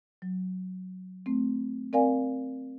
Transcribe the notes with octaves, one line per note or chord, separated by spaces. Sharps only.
F#3
A3 C4
C4 A#4 D5 F5 G#5